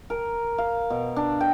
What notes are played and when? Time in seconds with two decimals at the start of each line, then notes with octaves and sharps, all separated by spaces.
0.10 A#4
0.58 F5
0.90 B2
1.16 D4
1.41 G5